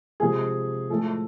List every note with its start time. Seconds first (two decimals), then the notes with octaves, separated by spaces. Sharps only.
0.20 C3 F3 G#3 G#4
0.90 A2 F3 G#3 A4